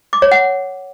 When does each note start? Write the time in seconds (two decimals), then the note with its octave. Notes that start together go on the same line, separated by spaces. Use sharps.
0.13 D6
0.22 C#5
0.31 F#5